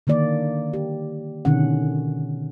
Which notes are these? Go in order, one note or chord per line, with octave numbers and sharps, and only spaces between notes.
D3 D#3 A#3 D5
G4
B2 D3 D#3 C#4 F#5